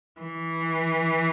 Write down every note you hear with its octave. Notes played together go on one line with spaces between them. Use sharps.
E3